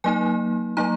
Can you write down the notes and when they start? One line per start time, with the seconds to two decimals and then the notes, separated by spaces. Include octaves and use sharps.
0.04 F#3 A#3 D#4 G#5
0.77 F#3 A#3 D#4 A#5